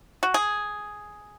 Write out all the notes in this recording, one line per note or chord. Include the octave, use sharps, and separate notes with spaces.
F#4
G#4